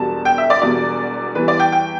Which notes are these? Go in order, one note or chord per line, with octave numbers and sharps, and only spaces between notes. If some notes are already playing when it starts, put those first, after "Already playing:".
Already playing: E1 E2 B2 G3 A5
G5
E5
D5
E1 E2 B2 G3 D5
E2 E3 G3 B4
D5
G5
G5